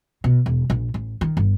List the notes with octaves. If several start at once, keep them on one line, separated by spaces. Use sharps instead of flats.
B2
E1
A#1
A1
D#3
G1